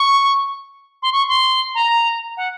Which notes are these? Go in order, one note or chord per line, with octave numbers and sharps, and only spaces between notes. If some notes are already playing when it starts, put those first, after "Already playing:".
Already playing: C#6
C6
C#6
C6
A#5
F#5